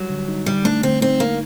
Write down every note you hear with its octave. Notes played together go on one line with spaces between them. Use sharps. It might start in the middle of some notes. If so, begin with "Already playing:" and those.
Already playing: F#3 G3
D3
D#4
D3 G3
A3 D4
D3 C4
C4 D#4
D3 A#3